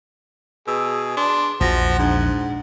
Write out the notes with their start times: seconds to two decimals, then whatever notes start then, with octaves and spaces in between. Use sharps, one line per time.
0.68 B2 G#4 E6
1.17 D4 C6
1.61 A#1 E2 F3 F#4 F#5 A#6
1.99 G#2 D4